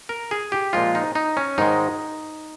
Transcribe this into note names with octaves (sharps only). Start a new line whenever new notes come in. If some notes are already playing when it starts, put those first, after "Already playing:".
A#4
G#4
G4
A#2 F3 G#3 F4
D#4
D#4
C#4
G#2 D#3 G#3 D#4